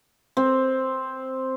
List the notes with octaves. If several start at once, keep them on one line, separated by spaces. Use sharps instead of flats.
C4